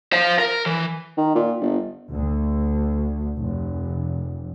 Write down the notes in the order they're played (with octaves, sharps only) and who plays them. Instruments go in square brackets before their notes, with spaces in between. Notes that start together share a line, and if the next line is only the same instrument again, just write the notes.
[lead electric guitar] C5 F5
A#4
E3
[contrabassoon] D#3
A#2
G1
[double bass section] D2
F1